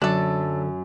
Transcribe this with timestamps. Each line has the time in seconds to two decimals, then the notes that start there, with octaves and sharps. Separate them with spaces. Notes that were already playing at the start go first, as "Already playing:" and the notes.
0.02 F#2 D3 F#3 D4 A4